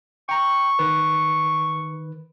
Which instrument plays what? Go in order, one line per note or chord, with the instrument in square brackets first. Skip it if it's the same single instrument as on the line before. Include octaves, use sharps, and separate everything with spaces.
[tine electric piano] G5 A#5 [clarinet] C#6
[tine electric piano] D#3 B4